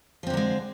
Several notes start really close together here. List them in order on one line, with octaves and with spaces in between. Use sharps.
F3 C4 D3 A#3 G#3